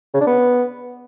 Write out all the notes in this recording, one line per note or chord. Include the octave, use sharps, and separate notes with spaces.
C#3
D4
B3